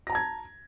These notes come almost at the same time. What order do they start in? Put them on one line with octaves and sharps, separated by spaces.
A#6 A#5 A5 G#6